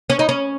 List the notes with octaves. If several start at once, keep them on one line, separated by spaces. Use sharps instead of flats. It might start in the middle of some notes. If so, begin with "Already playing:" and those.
C#4
D#4
C#4